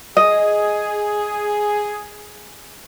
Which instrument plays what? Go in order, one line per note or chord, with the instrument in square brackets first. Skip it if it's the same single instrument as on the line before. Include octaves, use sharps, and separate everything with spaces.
[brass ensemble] G#4 [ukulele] D#5